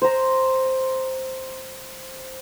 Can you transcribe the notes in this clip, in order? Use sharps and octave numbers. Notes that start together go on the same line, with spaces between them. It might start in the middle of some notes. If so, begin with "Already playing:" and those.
C5 A#5